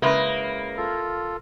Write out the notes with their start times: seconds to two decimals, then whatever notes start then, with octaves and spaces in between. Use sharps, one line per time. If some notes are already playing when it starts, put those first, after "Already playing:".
0.02 C#3 G#3 A#3 E4 B4
0.77 F4 A4